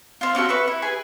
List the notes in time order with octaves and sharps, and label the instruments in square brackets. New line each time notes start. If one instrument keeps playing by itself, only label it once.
[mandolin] C4 F4
C4 C#4 F#4 A4
B4 E5 C#6
E4
G#4 B4 G#5